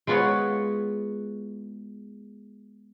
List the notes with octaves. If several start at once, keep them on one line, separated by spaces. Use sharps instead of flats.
G#3 B3 F4 F#4 B4 C#5